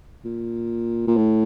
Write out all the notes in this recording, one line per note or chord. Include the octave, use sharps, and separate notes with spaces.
A#2
A#2
A2